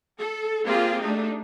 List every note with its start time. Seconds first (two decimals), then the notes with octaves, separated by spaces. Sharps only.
0.19 A4
0.65 A#3 C4 F4 G4 G#4
1.00 A3 D4 D#4